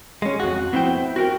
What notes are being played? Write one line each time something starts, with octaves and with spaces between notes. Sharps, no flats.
G#3 C#4
F2 F#4
B3 C4 E4 C5 G5
F#4 A#4 G5